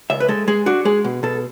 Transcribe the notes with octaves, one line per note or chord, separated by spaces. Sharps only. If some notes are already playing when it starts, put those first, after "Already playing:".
C#2 E5
B4
G#3 A4
G#3 G#4
D4 F#4
G#3 G#4
B2
B2 A4